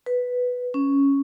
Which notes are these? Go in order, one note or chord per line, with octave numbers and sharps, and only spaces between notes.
B4
C#4